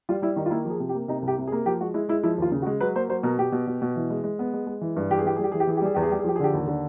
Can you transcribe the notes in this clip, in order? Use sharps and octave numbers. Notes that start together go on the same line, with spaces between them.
G3 F4
G3 E4
D#3 D#4
F4
A#3 E4
F3
G#4
C3
G4
A#3
C3 D#4
C2
G4
C3
G#4
A#3
F3 G4
G#3 F#4
G#3 E4
G#3 E4
F3 E4
D#2 F4
C#3
F#4
G#3
F#3 B4
A#3 C5
F#3 C5
B2 A#4
B2 G4
B2
B2
B2
E3
G#3
G#3
B3
G#3
G#3
E3
G2
E3 G4
G#4
E3 G4
G3 G#4
G4
E3 G#4
G4
E3 G#4
G4
G3 G#4
E2 G4
G#4
G3 G4
G#4
F3 G4
G#4
D3 G4
D#2
D3